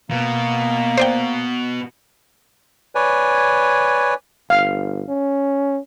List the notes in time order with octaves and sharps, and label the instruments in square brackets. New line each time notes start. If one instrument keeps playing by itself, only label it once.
[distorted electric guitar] B2 [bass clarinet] A#3
[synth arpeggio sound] C5 D5 G5
[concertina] B4 C#5 D5 G#5
[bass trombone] G1 [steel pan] F5
[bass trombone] C#4